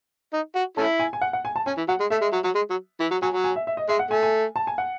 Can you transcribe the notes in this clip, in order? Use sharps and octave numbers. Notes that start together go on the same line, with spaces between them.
D#4
F#4
A3 C#4 E4 A5
G#5
G#5
F#5
F#5
G#5
A5
C#4 G#5
E3
F#3 F#5
G#3
A3 E5
G#3
F#3
F#3
G#3
F#3
E3
F#3
F#3 G#5
F#3
G#5
E5
E5
D#5
G#3 E5
F#5
A3 G#5
G#5
A5
G#5
F#5